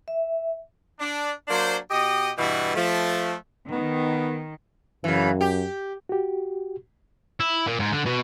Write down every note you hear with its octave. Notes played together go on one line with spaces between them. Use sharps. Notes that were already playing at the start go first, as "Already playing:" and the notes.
E5
D4
F#3 A#3 D4 C5
B2 G4 D#5
G2 B2 E3 G3 F#4
F3 A3
D#3 B3
F#2 C#3 E3
G4
F#4 G4
E4
A#2
G#2
D3
B2